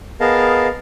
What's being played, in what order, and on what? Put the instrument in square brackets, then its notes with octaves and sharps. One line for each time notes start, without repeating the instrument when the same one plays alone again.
[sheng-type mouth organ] B3 G#4 A#4 D#5 F5 A5